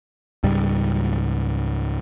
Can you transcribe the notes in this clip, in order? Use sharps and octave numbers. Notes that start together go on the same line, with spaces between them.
C#2 G#2 G3